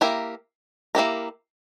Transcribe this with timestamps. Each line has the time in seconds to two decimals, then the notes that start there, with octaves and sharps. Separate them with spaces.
0.01 A#3 E4 G4 A#4
0.95 A#3 E4 G4 A#4